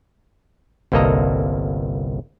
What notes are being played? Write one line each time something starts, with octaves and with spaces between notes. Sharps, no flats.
G1 C2 A#3 A4 D#5 A#5